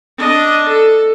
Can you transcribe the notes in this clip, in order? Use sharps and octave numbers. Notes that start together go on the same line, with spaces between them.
D4 D#5
A4